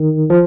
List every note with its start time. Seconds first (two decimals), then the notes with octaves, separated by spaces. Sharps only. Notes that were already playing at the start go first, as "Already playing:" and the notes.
Already playing: D#3
0.30 F3